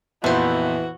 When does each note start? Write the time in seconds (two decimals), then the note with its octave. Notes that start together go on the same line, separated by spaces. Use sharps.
0.24 F2 A#2 E3 B3 E4 F#4 C5